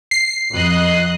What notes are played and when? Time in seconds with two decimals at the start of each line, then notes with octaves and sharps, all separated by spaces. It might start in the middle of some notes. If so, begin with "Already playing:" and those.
0.11 C7
0.53 F2 D#5 F#6